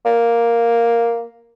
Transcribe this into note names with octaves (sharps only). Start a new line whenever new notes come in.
A#3